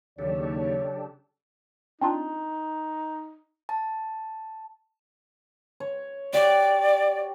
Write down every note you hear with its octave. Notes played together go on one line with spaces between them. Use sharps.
D#2 C#3 F#3 D4 G4 A4 C#5
C4 D4 D#4 F4
A5
C#5
F#4 G4 D5